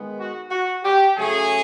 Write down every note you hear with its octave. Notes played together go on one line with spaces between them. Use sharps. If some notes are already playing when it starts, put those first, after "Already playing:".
Already playing: D#3 G#3 B3
F#4
F#4
G4
C#3 F#3 A3 C#4 G#4